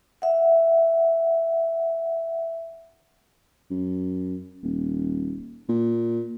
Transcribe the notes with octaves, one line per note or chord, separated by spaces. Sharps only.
E5 F#5
F#2
D#1
A#2